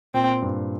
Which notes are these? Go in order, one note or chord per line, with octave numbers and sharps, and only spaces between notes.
A#2 C4
G2